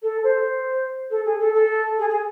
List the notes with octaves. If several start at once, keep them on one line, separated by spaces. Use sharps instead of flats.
A4
C5
A4
G#4
A4
A4
G#4
G#4